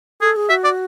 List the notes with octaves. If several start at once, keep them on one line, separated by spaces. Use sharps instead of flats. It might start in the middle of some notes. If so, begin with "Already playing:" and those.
G#4 A4
G#4
F#4 E5
D5